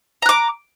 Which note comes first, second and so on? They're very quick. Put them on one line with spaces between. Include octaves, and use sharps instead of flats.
A#5 F#6 D6